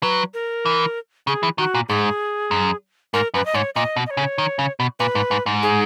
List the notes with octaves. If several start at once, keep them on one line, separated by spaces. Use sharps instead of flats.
F#3 B4
A#4
E3
C#3 G#4
E3
D#3 F#4
A#2
G#2 G#4
F#2
G#2 A#4
F#2 B4
D#5
G#2 C#5
A#2 D#5
B2
D#5
C#5
C#3
D#3
C#3
B2
A#2 B4
G#2
G#2
G#2
G#4